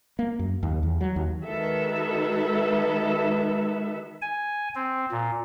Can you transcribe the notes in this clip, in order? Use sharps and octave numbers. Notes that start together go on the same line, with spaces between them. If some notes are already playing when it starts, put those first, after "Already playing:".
A#3
F#2
D#2
E2
F#3
D#2
D#3 G#3 F#4 A4 B4 E5
G#5
C4
A#2